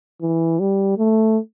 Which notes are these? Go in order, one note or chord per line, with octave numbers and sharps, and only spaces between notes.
E3
G3
A3